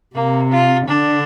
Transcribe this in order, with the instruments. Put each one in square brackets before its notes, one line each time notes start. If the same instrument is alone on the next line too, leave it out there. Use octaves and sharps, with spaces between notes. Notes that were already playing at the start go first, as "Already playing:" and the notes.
[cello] C3 [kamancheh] A#3
[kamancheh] F4
[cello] D3 [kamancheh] D4